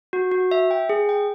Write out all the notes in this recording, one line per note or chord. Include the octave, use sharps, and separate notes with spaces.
F#4
F#4
E5
G5
G#4
G5